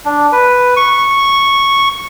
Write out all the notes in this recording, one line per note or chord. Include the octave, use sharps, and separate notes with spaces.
D4
B4
C#6